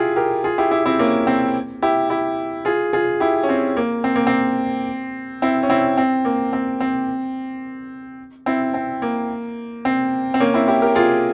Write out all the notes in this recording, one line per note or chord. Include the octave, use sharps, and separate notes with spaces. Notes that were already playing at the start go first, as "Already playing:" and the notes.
Already playing: E4 F4 G4 G#4
G4 A#4
F4 G#4
E4 G4
E4 G4
C4 E4
A#3 C#4
C4
E4 G4
E4 G4
F4 G#4
F4 G#4
E4 G4
C#4
C4
A#3
C4
A#3
C4
C4 E4
C#4
C4 E4
C4
A#3
C4
C4
C4 E4
C4
A#3
C4
C4
A#3 C#4
C4 E4
E4 G4
G4 A#4
F4 G#4